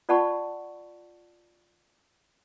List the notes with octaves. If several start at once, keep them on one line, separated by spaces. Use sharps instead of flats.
F4 D5 F#5 A5 B5 C#6